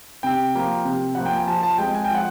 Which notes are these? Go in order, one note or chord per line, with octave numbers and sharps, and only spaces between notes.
C3 G5
F3 A#3
C3
F3 A#3 F#5
G5
G#5
F3 A5
A5
G#3 C4 G5
G#5
G5
F3 F#5